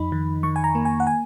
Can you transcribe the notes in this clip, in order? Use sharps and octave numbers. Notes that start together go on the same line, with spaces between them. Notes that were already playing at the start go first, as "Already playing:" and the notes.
Already playing: F2 F3 D#4 B5
D#3
D#3 C#6
G#5
A#5
A#3
G#5
F#5
G#5